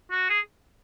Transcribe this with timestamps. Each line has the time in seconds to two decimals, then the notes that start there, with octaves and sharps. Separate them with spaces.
0.12 F#4
0.30 G#4